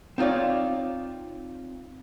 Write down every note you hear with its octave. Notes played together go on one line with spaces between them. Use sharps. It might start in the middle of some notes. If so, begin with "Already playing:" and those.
C4 D#4 F4 C#5 D5